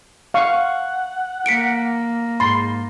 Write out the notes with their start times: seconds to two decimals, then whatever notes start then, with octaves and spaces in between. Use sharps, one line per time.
0.34 F5 F#5 C#6
1.46 A#3 B6 C#7 D7
2.40 G#2 B5 C6 A6